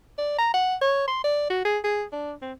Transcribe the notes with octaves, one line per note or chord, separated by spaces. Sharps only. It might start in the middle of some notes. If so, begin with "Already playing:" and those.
D5
A#5
F#5
C#5
C6
D5
F#4
G#4
G#4
D4
C4